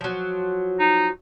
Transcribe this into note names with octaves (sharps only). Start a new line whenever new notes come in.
F3 F#3
D#4